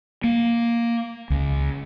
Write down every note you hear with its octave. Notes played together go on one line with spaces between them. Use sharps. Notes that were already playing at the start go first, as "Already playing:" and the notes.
A#3
C#2